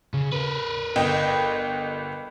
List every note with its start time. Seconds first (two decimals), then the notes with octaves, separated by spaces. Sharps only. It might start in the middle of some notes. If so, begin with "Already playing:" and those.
0.14 C#3
0.32 A#4 B4
0.96 G1 D#5 G5